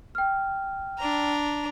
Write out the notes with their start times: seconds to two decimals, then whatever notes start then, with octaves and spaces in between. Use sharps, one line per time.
0.15 G5 F6
0.99 D4 A#5